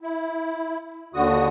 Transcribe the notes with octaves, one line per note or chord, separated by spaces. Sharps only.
E4
D#2 D3 F#4 D#6